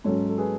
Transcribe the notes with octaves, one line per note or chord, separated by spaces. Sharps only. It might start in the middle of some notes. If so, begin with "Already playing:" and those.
G#2 F#3 C#4 A4 C#5
A4
G#4 B4